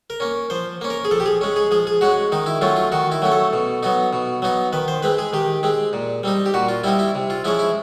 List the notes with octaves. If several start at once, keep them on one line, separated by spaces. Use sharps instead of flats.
A#4
A#3 C#4
F3 C5
A#3 C#4
A#4
G#4
F3 A4
G4
G#4
G#3 C#4
G#4
F3 G#4
G#4
G#3 C#4 F#4
D#3 D#4
E4
F#3 A3 C#4 F4
F4
D#3 F#4
E4
F#3 A3 C#4
A4
B2
F#3 B3 D#4
B2
F#3 B3 D#4
D#3 B4
C5
G#3 C4 B4
G#4
D#3 G4
G#3 C4
A#2
G3 C4 D#4
G4
A#2 F#4
F4
G3 C4 D#4 E4
E4
C3
F4
F3 G#3 C#4 E4
E4